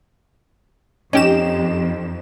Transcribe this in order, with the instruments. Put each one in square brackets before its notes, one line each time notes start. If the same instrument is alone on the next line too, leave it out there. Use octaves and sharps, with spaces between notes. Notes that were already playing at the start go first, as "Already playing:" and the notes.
[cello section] F2 [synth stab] C#4 G4 E7 [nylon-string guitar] D#4